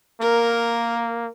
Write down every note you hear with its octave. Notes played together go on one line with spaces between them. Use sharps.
A#3 A#4